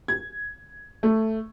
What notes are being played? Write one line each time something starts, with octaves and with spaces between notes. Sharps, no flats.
G#6
A3